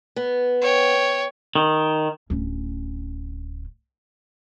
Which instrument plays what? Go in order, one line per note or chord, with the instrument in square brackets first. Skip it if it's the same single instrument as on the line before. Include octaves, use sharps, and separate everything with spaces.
[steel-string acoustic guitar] B3
[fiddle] C#5 G5
[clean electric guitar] D#3
[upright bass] D1 C#4